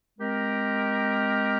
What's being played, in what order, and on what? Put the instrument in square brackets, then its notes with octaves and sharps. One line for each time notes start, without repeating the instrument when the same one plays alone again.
[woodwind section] G#3 C4 G4 A#4